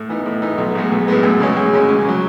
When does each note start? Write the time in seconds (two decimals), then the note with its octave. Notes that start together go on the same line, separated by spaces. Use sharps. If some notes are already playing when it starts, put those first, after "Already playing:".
Already playing: A2
0.09 E3 B3 D#4
0.26 A2
0.42 E3 B3 D#4
0.58 B1
0.75 A2 G#3 B3
0.91 B1
1.08 A2 G#3 B3
1.23 F#2
1.40 C#3 G#3 C#4
1.57 F#2
1.73 C#3 G#3 C#4
1.89 C#2
2.05 C#3 F#3